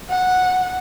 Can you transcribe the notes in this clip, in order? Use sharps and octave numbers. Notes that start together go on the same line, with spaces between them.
F#5